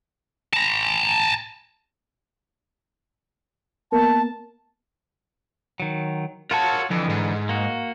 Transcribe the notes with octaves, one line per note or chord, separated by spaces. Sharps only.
A5 A#5
A#3 B3 A#4 A5
D#3 F#3
F4 F#4 A#4 C#5 A5
F2 D3 E3
G#2
A#3 F#4